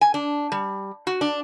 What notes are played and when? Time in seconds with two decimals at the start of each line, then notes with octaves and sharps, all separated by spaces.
0.01 G#5
0.14 D4
0.52 G3
1.07 F#4
1.21 D4